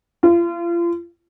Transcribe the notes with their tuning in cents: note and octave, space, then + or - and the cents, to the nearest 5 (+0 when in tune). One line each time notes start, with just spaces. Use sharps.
F4 -35